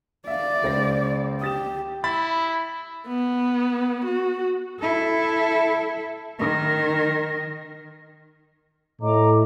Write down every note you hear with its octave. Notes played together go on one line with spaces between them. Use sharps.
D5 E5 F5
C#2 C5 A#6
G4 D#6 A6 E7
E4 B5 A6
B3
F#4
E4 A4
D#3 A#4
A2 D#5 A#5 D6